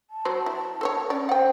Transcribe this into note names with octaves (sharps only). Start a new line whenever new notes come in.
A5
F#3 F#4 C5
E4
A4 C5 C#5
C#4 D5
C5 F#5 G5